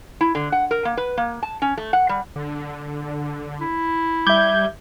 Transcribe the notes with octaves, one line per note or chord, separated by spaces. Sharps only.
E4
D3
F#5
A#4
A#3
B4
A#3
A5
C#4
A3
F#5
G3
D3
E4
G3 E5 D6 G6 G#6